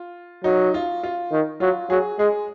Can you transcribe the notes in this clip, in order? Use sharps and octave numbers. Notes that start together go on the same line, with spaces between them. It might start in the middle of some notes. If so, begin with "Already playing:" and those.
Already playing: F4
F#3 D#4
F4
F4
D#3
F#3 F4
F#3 G#4
G#3 G#4